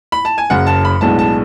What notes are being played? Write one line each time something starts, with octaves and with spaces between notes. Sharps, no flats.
B5
A5
G#5
F#1 F#2 C#3 F#5
A5
B5
B1 A2 G#3 B3 D4 A5
A5